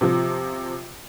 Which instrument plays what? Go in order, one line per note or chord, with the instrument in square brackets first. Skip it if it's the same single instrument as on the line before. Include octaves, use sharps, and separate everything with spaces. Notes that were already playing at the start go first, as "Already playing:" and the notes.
[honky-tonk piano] C3 F3